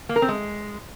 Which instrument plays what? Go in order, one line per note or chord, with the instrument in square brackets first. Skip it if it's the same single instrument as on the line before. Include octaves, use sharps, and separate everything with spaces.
[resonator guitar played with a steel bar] A#3
A#4
C4
G#3